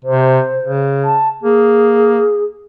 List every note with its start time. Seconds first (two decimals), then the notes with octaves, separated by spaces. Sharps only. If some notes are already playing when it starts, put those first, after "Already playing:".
0.05 C3 C5
0.63 C#3
1.05 A5
1.43 A#3 G#4